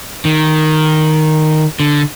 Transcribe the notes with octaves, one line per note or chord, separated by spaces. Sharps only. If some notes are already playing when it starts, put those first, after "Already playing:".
D#3
D3